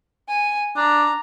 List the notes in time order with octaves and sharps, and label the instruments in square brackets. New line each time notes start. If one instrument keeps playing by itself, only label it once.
[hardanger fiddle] G#5
[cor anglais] D4 [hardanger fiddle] A#5